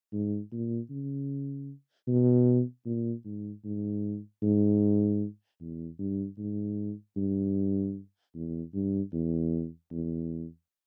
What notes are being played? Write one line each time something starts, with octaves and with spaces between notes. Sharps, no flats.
G#2
A#2
C#3
B2
A#2
G#2
G#2
G#2
E2
G2
G#2
G2
E2
G2
E2
E2